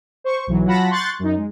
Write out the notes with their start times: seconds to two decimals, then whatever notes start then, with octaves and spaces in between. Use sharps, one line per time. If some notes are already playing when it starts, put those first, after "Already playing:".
0.24 C5 C#6
0.47 B1 E3 F#3
0.66 F#3 F4 F#5 A5 B5 A#6
0.90 C6 C#6 F#6 G6 A6
1.19 F#2 D#4
1.37 G#3